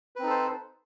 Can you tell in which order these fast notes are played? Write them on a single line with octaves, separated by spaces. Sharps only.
B4 C4 D#4 A4 C5